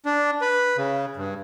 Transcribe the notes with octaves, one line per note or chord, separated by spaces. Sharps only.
D4
B4
C#3
G2